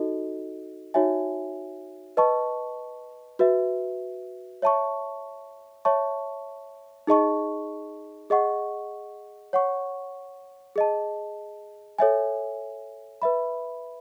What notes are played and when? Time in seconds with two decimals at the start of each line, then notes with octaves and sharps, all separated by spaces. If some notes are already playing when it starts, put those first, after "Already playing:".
Already playing: D#4 F#4 A4 D#5
0.94 D#4 F#4 C#5 E5 G#5
2.17 B4 D#5 A5 C#6
3.39 F#4 B4 E5
4.62 C#5 E5 A5 C#6
5.85 C#5 E5 A5 C#6
7.07 D#4 G#4 D#5 A5 C#6
8.30 G#4 D#5 F#5 C#6
9.53 C#5 F#5 C#6
10.76 G#4 D#5 A5
11.98 A4 C#5 E5 G#5
13.22 B4 E5 B5